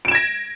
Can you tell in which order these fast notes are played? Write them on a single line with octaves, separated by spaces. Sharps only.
D7 E7 G#6 A#6